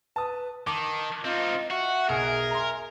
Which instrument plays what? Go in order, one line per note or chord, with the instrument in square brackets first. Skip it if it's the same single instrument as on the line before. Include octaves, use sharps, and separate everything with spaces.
[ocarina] B4 [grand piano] A5 D#6
[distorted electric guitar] D#3 [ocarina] A5 [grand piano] D6
[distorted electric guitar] C4 D#4 [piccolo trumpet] F4 [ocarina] D#5
[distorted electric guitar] F#4 [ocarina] E5 [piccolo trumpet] F#5
[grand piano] B1 F6 [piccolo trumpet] G#4 [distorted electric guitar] A#4
[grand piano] A#5 C6